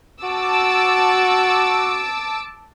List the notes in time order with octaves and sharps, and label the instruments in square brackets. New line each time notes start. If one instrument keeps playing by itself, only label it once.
[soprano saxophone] F#4 [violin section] A5 D6 E6